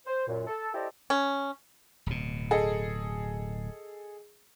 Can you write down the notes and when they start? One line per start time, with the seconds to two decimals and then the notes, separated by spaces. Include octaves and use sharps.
0.06 C5
0.28 F#2 A#2
0.47 A4
0.74 E4 G4 A4 C5 D5 D#5
1.10 C#4
2.06 D1 B2
2.51 G#4 A4 D#5